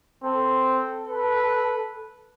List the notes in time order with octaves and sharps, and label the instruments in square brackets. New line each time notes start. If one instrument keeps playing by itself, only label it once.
[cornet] C4 [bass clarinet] A4
[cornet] B4